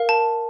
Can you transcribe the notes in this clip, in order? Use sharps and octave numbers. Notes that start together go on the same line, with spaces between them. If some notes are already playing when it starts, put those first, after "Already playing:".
Already playing: A#4 F5
A5